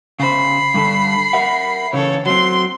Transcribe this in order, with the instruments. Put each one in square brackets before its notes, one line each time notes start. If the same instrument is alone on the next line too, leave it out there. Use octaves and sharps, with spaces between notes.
[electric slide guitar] C#3 C5 [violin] B5 C7
[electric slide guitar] G2 D3 A4
A#4 E5 F#5
[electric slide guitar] C#3 E3 [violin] A4 C#5
[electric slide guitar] F#3 C4 [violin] C6